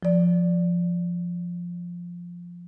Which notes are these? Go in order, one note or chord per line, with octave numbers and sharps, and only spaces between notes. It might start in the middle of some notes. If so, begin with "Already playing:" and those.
F3 D5